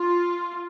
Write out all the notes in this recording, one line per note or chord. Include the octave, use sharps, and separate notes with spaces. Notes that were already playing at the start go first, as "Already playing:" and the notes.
Already playing: F4